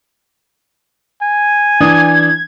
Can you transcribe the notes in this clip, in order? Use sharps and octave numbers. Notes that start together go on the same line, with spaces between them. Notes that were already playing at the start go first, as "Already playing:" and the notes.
G#5
E3 D4 D#6 G#6